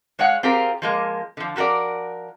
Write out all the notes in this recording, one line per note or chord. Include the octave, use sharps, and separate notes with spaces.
G#3 C#5 F5 F#5
C4 F4 G4 G#4 A#4
F3 G#3 A#3
D3 F3
F3 F#4 A4 A#4 D5